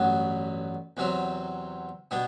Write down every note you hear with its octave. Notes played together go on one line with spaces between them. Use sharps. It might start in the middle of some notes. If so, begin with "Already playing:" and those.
Already playing: A1 G2 F#3 B3
E2 C3 F#3 C4
B2 G3 B3 D4